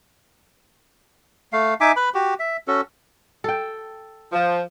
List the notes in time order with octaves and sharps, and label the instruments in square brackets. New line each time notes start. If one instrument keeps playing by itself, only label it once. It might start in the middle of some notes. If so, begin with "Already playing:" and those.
[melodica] A3 F5
D#4 E5 G#5 D6
B4 B5
F#4 G4
E5
C#4 F#4 A4
[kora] A4 G5
[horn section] F3